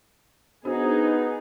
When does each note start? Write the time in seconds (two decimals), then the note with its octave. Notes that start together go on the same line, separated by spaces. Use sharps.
0.65 B3 D4 D#4 F#4 G#4 C5